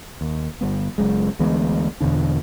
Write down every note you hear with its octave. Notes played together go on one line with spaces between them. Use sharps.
D#2
G1 G3 B3
F#1 F#2 G#3
D2 E3 G#3 B3
E2 B2 D3 D4